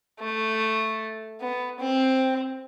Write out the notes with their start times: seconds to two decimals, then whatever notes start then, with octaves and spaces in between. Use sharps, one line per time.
0.20 A3
1.41 B3
1.80 C4